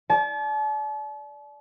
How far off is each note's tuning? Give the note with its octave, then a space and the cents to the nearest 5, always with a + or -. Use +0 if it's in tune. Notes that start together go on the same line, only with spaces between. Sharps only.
D5 -10 A5 -40